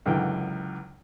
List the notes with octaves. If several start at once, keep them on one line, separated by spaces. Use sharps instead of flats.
C#2 F#2 D3 E3 G5